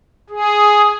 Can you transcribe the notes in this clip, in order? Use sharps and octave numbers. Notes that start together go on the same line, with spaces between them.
G#4